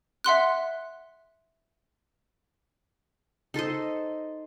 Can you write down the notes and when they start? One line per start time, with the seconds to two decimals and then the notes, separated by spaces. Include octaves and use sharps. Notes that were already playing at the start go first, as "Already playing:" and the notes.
0.24 E5 F#5 C6 F#6
3.54 D#4 A4 C5 D#5